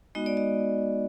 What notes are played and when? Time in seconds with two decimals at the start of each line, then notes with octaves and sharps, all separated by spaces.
0.15 G#3 B3 D#4 F#4 D#5
0.26 D5
0.37 D#5